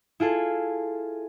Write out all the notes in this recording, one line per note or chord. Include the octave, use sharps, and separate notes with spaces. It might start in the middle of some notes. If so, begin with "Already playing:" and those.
E4 F4 G#4 A4